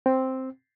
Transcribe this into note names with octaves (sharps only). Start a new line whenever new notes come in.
C4